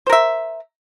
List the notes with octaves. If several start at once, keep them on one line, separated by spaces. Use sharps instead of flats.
A#4 C5 E5